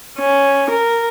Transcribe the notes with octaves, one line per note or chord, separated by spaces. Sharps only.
C#4
A#4